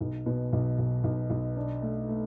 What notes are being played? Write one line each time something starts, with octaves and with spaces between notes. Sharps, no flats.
B1
B2
B1
B1
B1
B1
D4
A3
A3